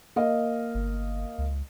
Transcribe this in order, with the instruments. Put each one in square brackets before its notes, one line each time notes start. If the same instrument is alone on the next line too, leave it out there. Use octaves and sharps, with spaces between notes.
[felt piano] A#3 D#5 F5
[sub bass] G1
C#2